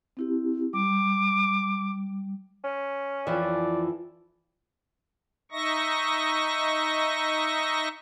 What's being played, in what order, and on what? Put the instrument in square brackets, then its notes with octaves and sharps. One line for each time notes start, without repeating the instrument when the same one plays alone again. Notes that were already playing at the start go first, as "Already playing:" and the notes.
[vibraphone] C4 E4 G4
[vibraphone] G3 [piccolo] D6
[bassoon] C#4
[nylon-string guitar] F2 E3 F3 [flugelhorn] D5
[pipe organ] D#4 D#5 E5 C#6 A#6